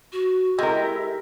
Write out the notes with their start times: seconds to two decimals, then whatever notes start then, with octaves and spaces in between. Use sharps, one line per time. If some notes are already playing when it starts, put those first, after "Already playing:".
0.12 F#4
0.59 G#3 E4 G4 A4 A#4 D#5 E5